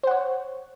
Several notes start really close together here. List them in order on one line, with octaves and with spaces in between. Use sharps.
C5 F#5 C#5